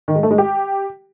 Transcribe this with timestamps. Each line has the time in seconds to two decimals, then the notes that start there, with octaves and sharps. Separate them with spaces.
0.08 D#3
0.15 G#3
0.23 A3
0.31 G#3
0.38 G4